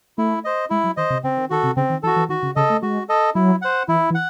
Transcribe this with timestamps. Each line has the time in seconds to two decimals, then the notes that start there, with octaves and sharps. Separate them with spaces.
0.18 A3 E4
0.45 C5 D#5
0.70 G#3 E4
0.84 F#3
0.97 D#3 C5 D#5
1.10 C3
1.24 C#3 C4
1.37 D#3
1.50 D#3 F#4 A4
1.63 C3
1.76 C#3 C4
1.90 D#3
2.03 E3 A4
2.07 F#4
2.16 E3
2.29 D#3 F#4
2.43 C#3
2.56 C#3 A4 D#5
2.69 A3
2.82 G#3 F#4
3.09 A4 D#5
3.35 F#3 E4
3.62 C5 F#5
3.88 E3 E4
4.10 E3
4.15 F#5